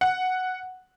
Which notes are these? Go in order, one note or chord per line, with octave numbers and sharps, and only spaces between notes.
F#5